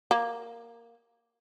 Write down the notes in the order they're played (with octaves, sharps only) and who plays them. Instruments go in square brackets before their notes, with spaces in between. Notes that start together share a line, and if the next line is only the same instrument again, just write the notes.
[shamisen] A#3